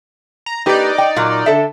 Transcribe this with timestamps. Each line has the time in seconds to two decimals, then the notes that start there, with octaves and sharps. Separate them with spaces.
0.46 A#5
0.66 A#3 D#4 G4 B4 D5
0.98 G5
1.16 A#2 F#3 A#3
1.46 D3 A4 E5